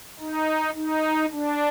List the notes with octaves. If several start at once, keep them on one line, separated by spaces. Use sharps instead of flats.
D#4
D#4
D4